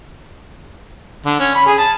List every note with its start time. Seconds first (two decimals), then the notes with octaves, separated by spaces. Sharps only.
1.26 D3
1.40 C#4
1.55 B5
1.66 G#4
1.78 A5